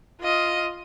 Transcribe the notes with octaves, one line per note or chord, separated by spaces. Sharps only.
F4 D#5